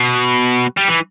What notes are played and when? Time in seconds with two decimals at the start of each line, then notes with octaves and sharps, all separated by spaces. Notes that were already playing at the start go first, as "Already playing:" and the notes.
Already playing: B2
0.77 G3
0.88 E3